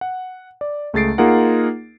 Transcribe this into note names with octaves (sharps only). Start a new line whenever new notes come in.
F#5
D5
C#2 A3 G#4 A6 C7 D7
A#3 D#4 F4 G#4 A#4 F#5